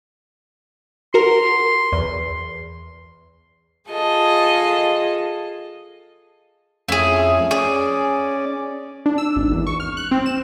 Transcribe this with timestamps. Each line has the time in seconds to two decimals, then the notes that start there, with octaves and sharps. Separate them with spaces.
1.14 F#4 A#4 C6
1.92 E2
3.88 F4 G#4 A4 D#5
6.88 F2 A3 C#4 E4 G#4
7.51 C#4 G#4 D5
9.06 D4
9.18 E6
9.36 G#1
9.52 E2
9.67 C#6
9.80 F6
9.97 F#6
10.11 C4
10.26 E7